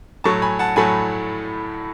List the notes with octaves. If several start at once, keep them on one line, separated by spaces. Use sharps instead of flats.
A2 F#3 A3 A5 C#6
G#5 B5
F#5 A5
A2 F#3 A3 G#5 B5